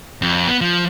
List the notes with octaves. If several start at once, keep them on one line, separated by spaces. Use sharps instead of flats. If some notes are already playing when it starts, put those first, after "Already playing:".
F2
B3
F3